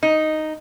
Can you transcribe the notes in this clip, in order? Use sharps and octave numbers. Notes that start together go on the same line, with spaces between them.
D#4